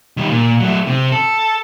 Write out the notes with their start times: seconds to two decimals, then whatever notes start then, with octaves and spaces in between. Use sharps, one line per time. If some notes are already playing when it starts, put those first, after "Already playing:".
0.17 D#3 G3
0.31 A#2
0.60 F#3 A3
0.87 C3
1.12 A4